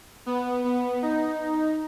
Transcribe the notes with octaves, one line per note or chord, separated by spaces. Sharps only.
B3
B3
D#4